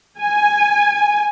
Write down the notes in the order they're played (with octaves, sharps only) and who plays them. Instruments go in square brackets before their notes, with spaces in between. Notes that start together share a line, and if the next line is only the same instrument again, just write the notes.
[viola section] G#5